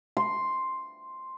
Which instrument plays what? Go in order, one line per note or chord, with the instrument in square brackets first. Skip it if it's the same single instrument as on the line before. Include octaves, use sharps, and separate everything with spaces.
[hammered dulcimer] C6